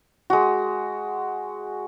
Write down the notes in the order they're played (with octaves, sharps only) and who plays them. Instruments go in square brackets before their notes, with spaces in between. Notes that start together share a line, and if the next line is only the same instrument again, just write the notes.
[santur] G#3 F#4